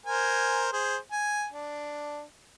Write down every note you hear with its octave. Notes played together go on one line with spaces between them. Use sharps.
A#4 C5 G#5
G#4 C5
G#5
D4